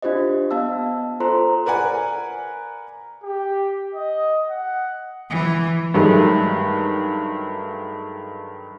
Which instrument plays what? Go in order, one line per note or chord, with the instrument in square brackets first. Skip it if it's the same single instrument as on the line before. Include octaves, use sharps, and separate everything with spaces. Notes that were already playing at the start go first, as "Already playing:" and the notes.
[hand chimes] D4 F4 G4 C5 D#5
B3 D#5 F5 A5 E6
F4 A4 C5 A#5 C6
[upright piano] A#4 B4 D5 F#5 G#5
[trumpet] G4
D#5
F#5
[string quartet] E3
[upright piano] G2 D#3 F#3 G#3 A3